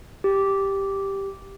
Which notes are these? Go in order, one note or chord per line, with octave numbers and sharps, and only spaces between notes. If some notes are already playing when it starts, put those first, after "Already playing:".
G4